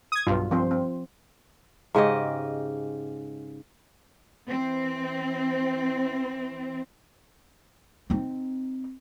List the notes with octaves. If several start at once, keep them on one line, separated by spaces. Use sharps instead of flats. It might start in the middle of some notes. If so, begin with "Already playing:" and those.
D#6 G#6
B1 G2 F4
F3 C4 C5
C4
G#2 C#3 G4 D#5
E3 C4
C4 D#4